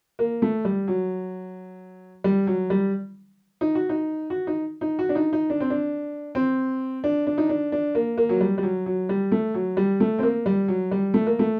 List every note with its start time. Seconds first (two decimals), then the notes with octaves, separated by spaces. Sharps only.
0.19 A#3
0.42 A3
0.65 G3
0.88 F#3
2.24 G3
2.47 F#3
2.70 G3
3.61 D#4
3.75 F#4
3.89 D#4
4.30 F#4
4.47 D#4
4.81 D#4
4.99 F#4
5.09 D4
5.15 D#4
5.33 D#4
5.50 D4
5.60 C4
5.70 D4
6.35 C4
7.04 D4
7.27 D4
7.38 D#4
7.49 D4
7.72 D4
7.95 A#3
8.18 A#3
8.29 F#3
8.41 G3
8.58 G3
8.63 F#3
8.86 F#3
9.09 G3
9.32 A3
9.54 F#3
9.77 G3
10.00 A3
10.19 C4
10.23 A#3
10.46 G3
10.68 F#3
10.91 G3
11.14 A3
11.27 A#3
11.39 A3